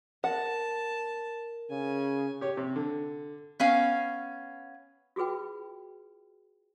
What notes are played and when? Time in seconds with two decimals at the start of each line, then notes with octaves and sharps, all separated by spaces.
0.24 A#4 F#5 A5
1.71 C#3 G#5
2.41 G4 C#5
2.57 C3
2.76 D3
3.60 B3 C#4 F5
5.16 F4 F#4 G#4 B4 G5